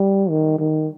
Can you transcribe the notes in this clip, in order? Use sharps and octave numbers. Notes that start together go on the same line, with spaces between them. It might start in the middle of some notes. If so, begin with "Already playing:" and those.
Already playing: G3
D#3
D#3